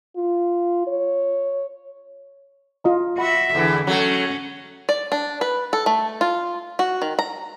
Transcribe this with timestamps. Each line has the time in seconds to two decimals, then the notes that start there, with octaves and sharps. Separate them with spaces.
0.17 F4
0.87 C#5
2.84 F4 D#5 A#5
3.18 F#4 E5 F#5 B5
3.55 E2 D3 E3
3.87 F#3 A3 C#4
4.89 D5
5.12 D4
5.41 B4
5.73 A4
5.86 A3
6.21 F4
6.79 F#4
7.02 D#3
7.19 A#5